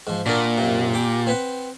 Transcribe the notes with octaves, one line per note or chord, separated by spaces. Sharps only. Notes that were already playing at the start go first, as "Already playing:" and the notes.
G#2 F3
A#2 D4 F#4 A#4
F#2 C3
G4 D6
C4 B4 F#5